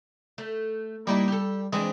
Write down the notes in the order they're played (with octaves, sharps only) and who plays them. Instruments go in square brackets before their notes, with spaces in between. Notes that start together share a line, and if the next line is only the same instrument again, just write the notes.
[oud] A3
[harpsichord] G3 [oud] A#3 D#4 E4
[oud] G4 A4
[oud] E3 C4 D4 [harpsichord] G#3